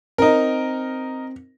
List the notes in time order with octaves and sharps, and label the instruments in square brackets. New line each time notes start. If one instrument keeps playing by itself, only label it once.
[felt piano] C4 [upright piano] D#4 A#4